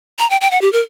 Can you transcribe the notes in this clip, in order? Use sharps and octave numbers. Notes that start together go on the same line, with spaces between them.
A#5
G5
G5
F#5
G4
A#4